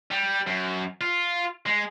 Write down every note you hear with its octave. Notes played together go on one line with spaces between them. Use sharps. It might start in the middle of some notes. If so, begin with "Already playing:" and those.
G3
F#2
F4
G#3